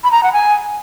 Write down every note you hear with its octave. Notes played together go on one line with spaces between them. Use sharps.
B5
A#5
F#5
G#5